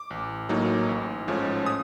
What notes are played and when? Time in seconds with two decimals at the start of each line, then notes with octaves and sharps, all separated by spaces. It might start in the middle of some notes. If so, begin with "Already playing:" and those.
Already playing: D6
0.10 A1
0.49 A2 F#3 A#3 D#4
0.89 A1
1.28 G#2 F3 A3 C#4
1.66 D#6